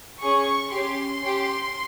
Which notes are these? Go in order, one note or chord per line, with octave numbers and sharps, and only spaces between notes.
C#4 G#4 C#6
C#4 G4 C6
C#4 G4